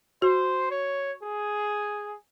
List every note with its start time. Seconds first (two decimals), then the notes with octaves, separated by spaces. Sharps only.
0.22 F#4 C5
0.71 C#5
1.23 G#4